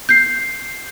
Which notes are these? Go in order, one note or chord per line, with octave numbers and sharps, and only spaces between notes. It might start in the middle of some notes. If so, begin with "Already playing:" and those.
G6 C7